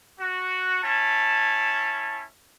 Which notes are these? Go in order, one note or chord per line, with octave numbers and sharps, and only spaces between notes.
F#4
C#4 E4 A5